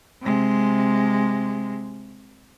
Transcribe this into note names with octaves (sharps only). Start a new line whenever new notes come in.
C3 G#3